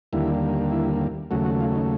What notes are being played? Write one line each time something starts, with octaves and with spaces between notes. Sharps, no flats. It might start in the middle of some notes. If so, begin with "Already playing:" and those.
D#2 D3 G3 A#3 E4
E4
D#2 C#3 F#3 A3 F#4
F#4
F4
D#4